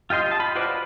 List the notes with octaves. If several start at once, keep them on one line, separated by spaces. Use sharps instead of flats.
F4 G4 D#5 C6
D#5 A5
B5
F4 F#4 B4 C5 D5
B4